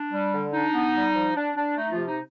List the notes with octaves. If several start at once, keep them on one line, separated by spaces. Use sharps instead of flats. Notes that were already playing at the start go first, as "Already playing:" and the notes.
Already playing: D4
G3
D3
D4 D#4
B3
G3
F3
D4
D4
A3 D#4
C3 F3 F4
D#4